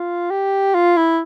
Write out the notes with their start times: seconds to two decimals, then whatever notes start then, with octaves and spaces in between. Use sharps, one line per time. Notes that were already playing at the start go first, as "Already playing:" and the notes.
Already playing: F4
0.30 G4
0.74 F4
0.96 E4